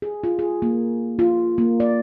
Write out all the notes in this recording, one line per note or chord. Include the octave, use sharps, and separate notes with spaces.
G#4
F4
G#4
A#3
F4
A#3
D5